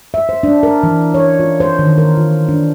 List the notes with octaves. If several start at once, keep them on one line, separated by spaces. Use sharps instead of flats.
E5
C5
D4
A#4
E3
C#5
F4
C5
D#3
A#4
F4
D4